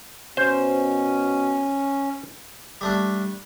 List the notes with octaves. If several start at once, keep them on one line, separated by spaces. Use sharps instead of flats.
B2 C#4 C5
G3 A3 D4